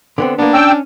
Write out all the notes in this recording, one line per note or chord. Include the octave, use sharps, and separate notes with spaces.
D3 B3 C4
A#3 B3 D4
C#4 G5 E6